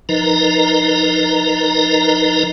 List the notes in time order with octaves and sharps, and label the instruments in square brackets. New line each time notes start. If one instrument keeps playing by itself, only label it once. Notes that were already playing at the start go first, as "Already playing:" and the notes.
[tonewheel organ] F3 D#4 A#4 B4 D#5 A#5